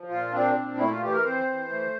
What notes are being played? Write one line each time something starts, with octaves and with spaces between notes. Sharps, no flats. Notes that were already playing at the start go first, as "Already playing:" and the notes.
Already playing: F3
A#2 F4
C4 D4
A#2
A3 E4
F4
E3 G4
A#4
C4 C5
E3
A3